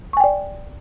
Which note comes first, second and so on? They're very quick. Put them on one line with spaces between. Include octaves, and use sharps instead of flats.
C#6 G#5 G5 D5